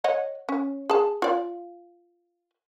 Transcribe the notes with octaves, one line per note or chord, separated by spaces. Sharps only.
C#5 D#5 F#5
C#4
G#4 A5
F4 D5